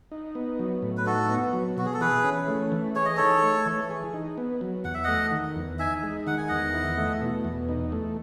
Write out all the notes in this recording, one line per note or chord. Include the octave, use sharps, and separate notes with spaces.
D#4
B3
F#3
A2
B4
D#4 F#4 A4
B3
F#3
B2 F#4
G#4
A4
E3 G#4 B4
C#4
A3
E3
G#4 C#5
D#5
D#4 A4 C#5
A3
E3
G#4
D#4
B3
F#3
E2 F#5
E5
A3 D#5 F#5
D#3
E2
D#4 E5 G#5
G#3
D#3 F#5
G#5
E2 D#5 F#5
E4
A3
B2
E2
D#4
A3